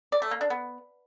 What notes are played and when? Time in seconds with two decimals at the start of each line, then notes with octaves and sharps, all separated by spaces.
0.12 D5
0.22 A3
0.31 A#3
0.41 D4
0.50 B3